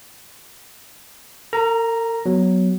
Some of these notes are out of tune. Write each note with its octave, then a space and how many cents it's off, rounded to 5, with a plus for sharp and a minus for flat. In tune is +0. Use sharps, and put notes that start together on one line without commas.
A#4 -40 A#5 +0
F#3 +5 B3 +0